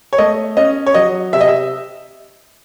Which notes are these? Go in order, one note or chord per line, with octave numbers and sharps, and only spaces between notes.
C#5
A3 D#5
C#4 D#5
C#5
F#3 D#5
C3 E5
D#5
E5